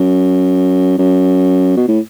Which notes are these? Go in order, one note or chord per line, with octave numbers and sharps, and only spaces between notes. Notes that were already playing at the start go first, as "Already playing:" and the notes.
Already playing: F#2
F#2
B2
A2